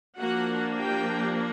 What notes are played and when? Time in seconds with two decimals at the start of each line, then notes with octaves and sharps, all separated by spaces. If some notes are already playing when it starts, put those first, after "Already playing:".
0.18 F3 A#3 D4 F#4 F#5
0.77 G4 G5